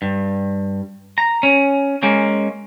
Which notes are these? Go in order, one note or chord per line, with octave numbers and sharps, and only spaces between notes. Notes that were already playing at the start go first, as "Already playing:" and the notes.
G2
A#5
C#4
G#3 A#3 C#4